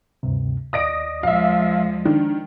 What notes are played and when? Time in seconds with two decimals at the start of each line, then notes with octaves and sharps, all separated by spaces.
0.23 D2 G2 C3
0.73 D#2 D5 D#5 D#6 A#6 D7
1.23 F3 G#3 E5 F5
2.06 D#3 D4